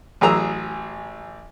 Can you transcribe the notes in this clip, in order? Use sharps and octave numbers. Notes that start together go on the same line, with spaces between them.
A1 F#3 G#4 A#5 D#6 E6